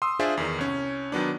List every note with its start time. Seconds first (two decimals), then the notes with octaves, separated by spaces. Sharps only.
0.02 C6 D#6 E6
0.19 D4 F4 G#4 C5 D5 E5
0.37 E2 D#3
0.58 C2 C#4
1.12 D#3 F#3 B3 D4